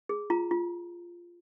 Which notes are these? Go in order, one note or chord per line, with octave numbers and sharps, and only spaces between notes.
G#4
F4 A#5
F4